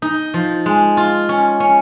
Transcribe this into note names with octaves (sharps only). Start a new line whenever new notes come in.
D#4
F3
G#3
F4
C#4
C#4